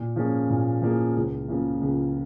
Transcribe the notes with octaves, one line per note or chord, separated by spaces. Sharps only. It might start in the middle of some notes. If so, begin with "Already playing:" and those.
Already playing: A#2
F3 A#3 C#4 G#4
A#2
F3 A#3 C#4 G#4
C#2
C#3 F3 A#3
C#2